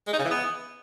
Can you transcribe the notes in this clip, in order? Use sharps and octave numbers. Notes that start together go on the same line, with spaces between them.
G#3
D#4
C#3
E3
B3